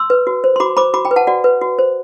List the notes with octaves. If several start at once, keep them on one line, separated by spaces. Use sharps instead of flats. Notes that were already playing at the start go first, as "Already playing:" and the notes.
Already playing: C6 E6
B4
F#4
C5
C6
F#4 B5 D6
C5 B5 D6
F#4 B5 D6
G5 B5
B4
F#5 A5
F#4 D5 F#5
B4
F#4
C5